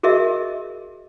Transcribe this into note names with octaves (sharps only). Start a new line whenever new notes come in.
F#4 G#4 A#4 D#5 E5